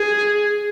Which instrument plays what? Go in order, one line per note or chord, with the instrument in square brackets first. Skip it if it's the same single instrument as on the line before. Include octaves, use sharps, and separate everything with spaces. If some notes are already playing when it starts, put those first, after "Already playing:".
Already playing: [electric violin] G#4